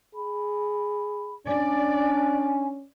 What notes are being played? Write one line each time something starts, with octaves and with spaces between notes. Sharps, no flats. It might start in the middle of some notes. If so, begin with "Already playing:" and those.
G#4 B5
C#4 D4 D5 G#5